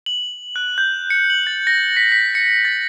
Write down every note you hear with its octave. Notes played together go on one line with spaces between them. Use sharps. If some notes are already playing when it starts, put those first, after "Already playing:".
F#7
F#6
G6
C#7
F#7
A6
A#6
B6
B6
C#7
A6